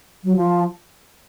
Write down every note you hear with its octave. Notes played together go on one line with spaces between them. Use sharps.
F#3
F3